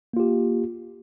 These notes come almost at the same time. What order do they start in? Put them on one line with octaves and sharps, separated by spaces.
A#3 F4 G4